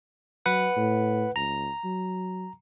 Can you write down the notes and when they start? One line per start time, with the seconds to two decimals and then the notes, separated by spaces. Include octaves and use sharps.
0.46 F#3 B4 F#5
0.76 A2
1.36 C#2 A#5
1.84 F#3